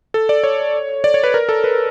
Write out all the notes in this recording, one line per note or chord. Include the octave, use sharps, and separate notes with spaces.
A4
D5
C#5
D5
C#5
B4
A#4
A4
B4